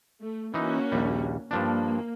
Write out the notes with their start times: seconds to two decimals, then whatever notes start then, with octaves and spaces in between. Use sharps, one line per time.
0.23 A3
0.54 E3 A#3 C#4 D#4 F#4
0.92 A#1 D#2 G3
1.51 G2 F3 A#3 D4